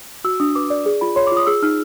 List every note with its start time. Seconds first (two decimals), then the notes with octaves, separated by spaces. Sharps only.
0.24 F#4 E6
0.40 D4 D#6
0.55 B4 D6
0.70 D5
0.86 G#4
1.01 F4 B5
1.16 C#5 C6
1.27 D6
1.32 F4
1.37 D#6
1.47 G#4 E6
1.62 D#4 F6